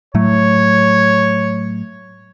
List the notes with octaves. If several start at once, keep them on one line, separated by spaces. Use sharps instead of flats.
A2 F#3 A3 C#5